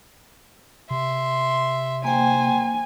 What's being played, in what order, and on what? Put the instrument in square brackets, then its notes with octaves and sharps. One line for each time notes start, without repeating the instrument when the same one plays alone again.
[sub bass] C3 [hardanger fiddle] E5 C6
[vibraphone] A#3 G5 [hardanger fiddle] C5 [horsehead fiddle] G#5